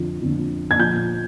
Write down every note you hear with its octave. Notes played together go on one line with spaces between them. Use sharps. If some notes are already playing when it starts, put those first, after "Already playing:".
Already playing: F2 D3 F3
F2 D3 F3
G#6
A#2 F3 G6